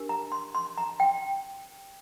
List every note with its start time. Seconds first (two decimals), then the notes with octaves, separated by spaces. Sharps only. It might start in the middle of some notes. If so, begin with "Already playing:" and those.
Already playing: D4 G4 A#4
0.09 A#5
0.32 C6
0.55 C6
0.78 A#5
1.00 G5